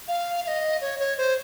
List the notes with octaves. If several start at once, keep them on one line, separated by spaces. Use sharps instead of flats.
F5
F5
D#5
C#5
C#5
C5